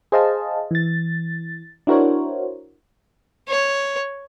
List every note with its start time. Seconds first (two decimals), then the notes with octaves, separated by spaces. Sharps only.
0.12 G#4 C5 D#5 F5 A5
0.71 E3 A6
1.87 D4 E4 F#4 A#4 C5 C#5
3.49 C#5